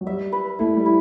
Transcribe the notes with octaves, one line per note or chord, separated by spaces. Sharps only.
F#3
G3 E5
B4
A3 E4
G3
E4